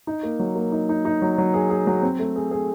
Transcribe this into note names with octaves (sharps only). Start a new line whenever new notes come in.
D#4
A#3
F#3
A#3
D#4
D#4
D#4
F#3
F#3
G#4
G#4
F#3
C4
A3
G#4
G#4